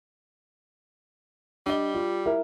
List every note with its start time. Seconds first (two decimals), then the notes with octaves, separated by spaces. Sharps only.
1.66 G3 D4 D#5 G7
1.94 F4
2.26 E4 A#4